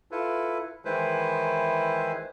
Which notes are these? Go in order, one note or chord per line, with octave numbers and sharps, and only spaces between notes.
E4 F4 A4 B4
D#3 E3 G#3 E4 B4 C5